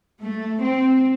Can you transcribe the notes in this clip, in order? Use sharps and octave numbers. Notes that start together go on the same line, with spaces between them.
A3
C4